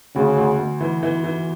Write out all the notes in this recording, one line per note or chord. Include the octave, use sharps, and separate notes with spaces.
D2 C#3
D2
D2
E3
E3
E3